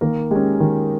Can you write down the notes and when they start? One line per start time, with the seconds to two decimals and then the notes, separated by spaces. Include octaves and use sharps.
0.01 D#3 A#3 A#4
0.31 G#3 C#4 G4
0.60 D#3